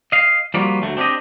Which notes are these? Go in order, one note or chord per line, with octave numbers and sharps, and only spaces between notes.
D#5 F5
F3 G3 A#3 B3 F4 F#4
D2 F#3 A3
C4 D4 F#4 G4 D#5